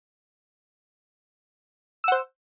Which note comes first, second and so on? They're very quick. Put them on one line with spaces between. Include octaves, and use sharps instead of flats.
E6 F#5 C5